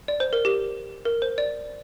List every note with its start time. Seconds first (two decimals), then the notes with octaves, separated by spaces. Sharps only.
0.08 D5
0.20 C5
0.33 A#4
0.45 G4
1.05 A#4
1.22 C5
1.38 D5